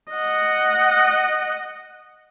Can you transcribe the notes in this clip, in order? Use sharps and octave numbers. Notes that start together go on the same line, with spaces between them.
D#5 F#5